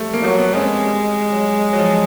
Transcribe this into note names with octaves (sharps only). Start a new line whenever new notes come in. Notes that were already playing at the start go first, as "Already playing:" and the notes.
Already playing: G3 A3
A#3
F#3
B3
G#3 C#4
C4
G3
F#3
F#3
F3